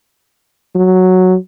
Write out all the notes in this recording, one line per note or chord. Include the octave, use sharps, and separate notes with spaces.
F#3